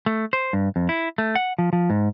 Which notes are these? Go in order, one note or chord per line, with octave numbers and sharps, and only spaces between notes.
A3
C5
G2
F2
E4
A3
F#5
F3
F3
G#2